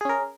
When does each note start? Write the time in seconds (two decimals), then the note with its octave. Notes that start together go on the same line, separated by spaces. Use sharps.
0.01 G#4
0.05 C#4
0.09 A#4